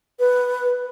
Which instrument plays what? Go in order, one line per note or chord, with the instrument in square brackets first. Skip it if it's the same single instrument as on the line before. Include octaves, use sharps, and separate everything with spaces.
[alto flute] B4